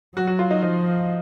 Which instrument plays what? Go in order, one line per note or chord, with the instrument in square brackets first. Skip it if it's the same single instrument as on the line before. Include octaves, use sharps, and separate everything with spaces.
[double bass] F#3 [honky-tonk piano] F#4
[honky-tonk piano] F#4
F4
D#4
[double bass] F3 [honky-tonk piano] D#4